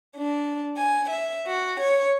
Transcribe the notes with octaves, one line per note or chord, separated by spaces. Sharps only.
D4
G#5
E5
F#4
C#5